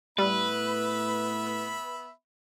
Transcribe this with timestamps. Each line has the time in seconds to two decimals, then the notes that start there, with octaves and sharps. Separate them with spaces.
0.18 A2 G3 B3 B4 E5 B5